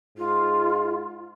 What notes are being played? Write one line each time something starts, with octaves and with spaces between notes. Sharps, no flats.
G#2 F4